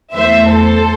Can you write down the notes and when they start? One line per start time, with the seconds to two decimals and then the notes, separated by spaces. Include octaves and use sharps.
0.13 E2 E3 A3 C5 E5
0.49 A4 C5